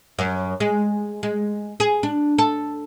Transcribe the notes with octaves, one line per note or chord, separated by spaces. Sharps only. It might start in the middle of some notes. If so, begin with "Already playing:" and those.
F#2
G#3
G#3
G#4
D4
A4